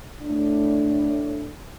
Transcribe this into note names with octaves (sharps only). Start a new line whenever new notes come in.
A2 D4